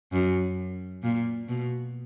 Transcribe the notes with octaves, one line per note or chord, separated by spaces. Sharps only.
F#2
A#2
B2